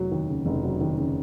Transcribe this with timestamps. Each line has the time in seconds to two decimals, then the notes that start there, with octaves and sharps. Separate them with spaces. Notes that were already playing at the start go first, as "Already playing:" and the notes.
Already playing: F1 F#3
0.12 D#2
0.28 C#3
0.46 F1
0.63 F#3
0.81 D#2
0.97 C#3